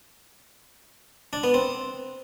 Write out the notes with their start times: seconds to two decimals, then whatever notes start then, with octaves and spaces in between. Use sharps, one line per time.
1.33 D4
1.44 B3
1.54 C4